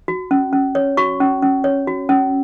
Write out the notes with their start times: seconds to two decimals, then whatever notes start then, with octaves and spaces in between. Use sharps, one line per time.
0.08 F#4
0.31 C#4
0.53 C#4
0.75 C#5
0.97 F#4 C#6
1.20 C#4
1.42 C#4
1.64 C#5
1.87 F#4
2.09 C#4